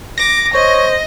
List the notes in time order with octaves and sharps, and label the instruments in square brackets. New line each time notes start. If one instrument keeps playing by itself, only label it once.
[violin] D6 [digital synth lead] A#6
[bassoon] C5 [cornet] C#5 [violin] D#5